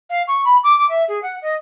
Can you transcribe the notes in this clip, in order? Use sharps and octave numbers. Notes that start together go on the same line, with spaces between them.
F5
C#6
B5
D6
D6
E5
G#4
F#5
D#5